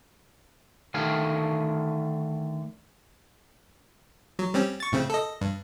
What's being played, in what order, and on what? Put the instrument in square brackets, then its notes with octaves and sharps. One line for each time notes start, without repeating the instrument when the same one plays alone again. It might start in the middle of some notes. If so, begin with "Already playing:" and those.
[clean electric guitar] D3 D#3 A3 F5 G#5
[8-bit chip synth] F#3
G3 C4 C#4
C#6 A6
A2 C#3 C4
A4 D#5
G2